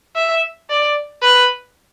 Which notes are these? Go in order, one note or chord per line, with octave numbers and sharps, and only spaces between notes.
E5
D5
B4